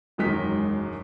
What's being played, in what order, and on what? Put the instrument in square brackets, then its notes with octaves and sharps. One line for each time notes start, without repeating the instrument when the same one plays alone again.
[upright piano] E1 F#2 D#3 G#3 B6